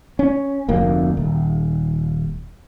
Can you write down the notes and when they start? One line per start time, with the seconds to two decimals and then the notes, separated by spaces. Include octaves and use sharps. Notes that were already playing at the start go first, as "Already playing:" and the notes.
0.19 C#4
0.69 F1 D2 A#3
1.17 D#1